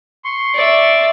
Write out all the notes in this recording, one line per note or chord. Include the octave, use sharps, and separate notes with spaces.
C6 C#6
D5 E5